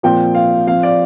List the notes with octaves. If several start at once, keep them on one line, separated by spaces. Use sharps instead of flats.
A#2 F3 C4 G5
F5
F3 C4 F5
D5